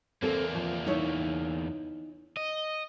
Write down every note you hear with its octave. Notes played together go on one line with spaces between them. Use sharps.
E2 A#3 C4 A4
F3
D#4 E4 C#5
D#5